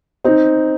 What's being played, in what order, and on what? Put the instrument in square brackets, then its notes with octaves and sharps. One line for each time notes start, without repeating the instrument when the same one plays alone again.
[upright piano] C4 D#4